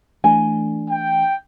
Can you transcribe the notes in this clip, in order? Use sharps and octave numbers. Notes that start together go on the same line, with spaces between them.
E3 A3 D4 G#5
G5